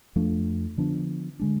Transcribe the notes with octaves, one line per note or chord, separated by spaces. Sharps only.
F2 F3 A3 D4
D3 F3 B3 D4
D3 G#3 D4